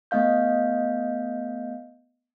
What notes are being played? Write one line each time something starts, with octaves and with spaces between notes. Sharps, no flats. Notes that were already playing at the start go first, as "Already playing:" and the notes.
A3 B3 D#5 F5 G6